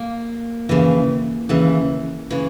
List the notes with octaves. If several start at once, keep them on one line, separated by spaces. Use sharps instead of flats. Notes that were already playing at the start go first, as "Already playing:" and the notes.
Already playing: A#3
D#2 C#3 E3
D#2 C#3 E3
C#3 E3